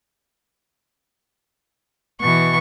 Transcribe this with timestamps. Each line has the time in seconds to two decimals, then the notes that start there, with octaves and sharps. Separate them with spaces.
2.21 B2 E3 C#6